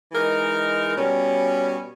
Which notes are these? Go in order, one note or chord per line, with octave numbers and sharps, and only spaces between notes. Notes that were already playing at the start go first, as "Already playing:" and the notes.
E3 G#3 D#4 A#4
B2 G3 C#4